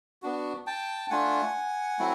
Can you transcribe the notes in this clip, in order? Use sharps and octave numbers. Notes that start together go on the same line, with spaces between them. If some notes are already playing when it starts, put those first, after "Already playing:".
B3 D4 F#4
G5 A5
A3 D4 F4 F#5 G#5
F#3 A3 C4 E4